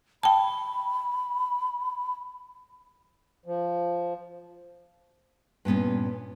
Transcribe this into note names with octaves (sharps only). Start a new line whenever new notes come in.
G5 A5 B5
F3
G2 A#2 B3 C#4